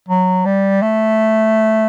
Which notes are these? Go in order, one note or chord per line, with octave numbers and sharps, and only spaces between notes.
F#3
G3
A3